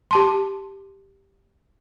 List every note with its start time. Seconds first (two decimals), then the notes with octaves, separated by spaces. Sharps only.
0.11 G4 A5 C6